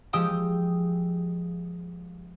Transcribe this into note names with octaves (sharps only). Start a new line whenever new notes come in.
F3 G#3 G4 G5 D#6 E6